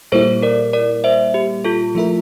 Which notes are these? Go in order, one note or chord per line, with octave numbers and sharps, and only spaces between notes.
A#2 G3 A#3 E4 A4 C5
A#4 D5
A#4 D5
C5 E5
G4
F4 A4
F3 A3 E4 A#4